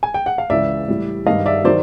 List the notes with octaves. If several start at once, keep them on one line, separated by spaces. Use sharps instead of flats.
G#5
G5
F#5
F5
C#2 C#3 E3 D5 E5
A2 E3 G3
G2 D#3 G3 D#5 F5
D5 E5
D#3 F#3 C5 D5